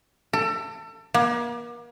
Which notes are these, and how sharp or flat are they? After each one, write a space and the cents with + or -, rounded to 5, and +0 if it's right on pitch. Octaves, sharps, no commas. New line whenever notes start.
A4 +30
A#3 +40